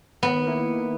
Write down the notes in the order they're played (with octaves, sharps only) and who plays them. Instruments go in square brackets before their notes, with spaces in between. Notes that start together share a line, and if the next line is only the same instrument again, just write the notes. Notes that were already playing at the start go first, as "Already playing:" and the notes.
[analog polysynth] D#3 [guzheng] B3
[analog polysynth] A#3 E4